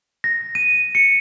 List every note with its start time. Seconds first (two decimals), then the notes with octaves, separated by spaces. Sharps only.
0.24 A#6
0.55 D#7
0.95 C#7